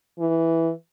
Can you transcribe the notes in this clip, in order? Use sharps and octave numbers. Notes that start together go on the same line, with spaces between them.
E3